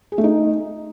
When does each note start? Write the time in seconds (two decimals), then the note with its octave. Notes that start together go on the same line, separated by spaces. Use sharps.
0.12 G#4
0.18 A3
0.24 D#4